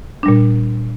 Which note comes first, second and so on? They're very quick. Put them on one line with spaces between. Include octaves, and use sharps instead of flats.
D4 G3 A#2